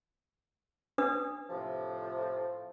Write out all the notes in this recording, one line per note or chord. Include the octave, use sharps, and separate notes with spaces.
D4 B4 D#6
A2 C3 F3